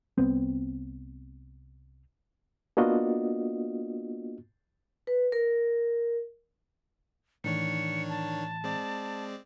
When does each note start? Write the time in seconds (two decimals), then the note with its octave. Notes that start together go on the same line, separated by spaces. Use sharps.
0.18 C2 B3 C4
2.77 A#3 B3 D4 F4 F#4 D#5
5.07 B4
5.32 A#4
7.44 A2 D#3 E3 D4 C#5 C#7
8.09 A5
8.64 G#3 C4 D5